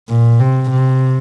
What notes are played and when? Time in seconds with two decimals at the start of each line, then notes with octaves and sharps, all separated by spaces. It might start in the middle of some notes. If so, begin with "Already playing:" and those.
0.08 A#2
0.40 C3
0.71 C3